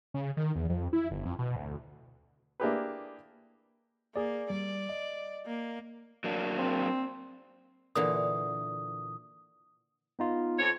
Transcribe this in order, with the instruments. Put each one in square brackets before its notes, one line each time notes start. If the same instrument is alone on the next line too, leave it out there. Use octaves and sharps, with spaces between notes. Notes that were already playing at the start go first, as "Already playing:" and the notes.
[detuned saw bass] C#3
D#3
E2
F2
E4
G1
F2
B2
D2
[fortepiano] A#3 D4 E4 G4 G#4 B4
[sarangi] A#3 [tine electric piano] G#4 D5
[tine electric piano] G3 [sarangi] D5
[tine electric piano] D#5
[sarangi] A#3
[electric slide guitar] F#3 A#3 D4
[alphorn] C4
[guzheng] A#2 D3 E3 [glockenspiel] D#6
[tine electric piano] B3 D#4 F4
[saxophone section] F2 C#5